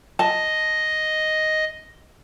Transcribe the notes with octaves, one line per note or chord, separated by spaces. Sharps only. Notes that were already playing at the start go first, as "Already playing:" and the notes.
D#5 A5